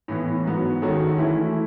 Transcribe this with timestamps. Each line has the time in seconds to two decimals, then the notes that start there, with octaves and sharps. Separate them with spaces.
0.08 A2 E3 B3
0.45 G#2 F#3 B3 F#4
0.82 D#3 G#3 C#4 F#4 A4
1.18 E3 A3 C#4 E4